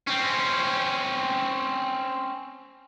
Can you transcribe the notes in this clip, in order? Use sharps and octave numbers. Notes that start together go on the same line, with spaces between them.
C4 C#4